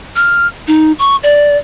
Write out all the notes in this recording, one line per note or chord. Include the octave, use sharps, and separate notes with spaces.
F6
D#4
C#6
D5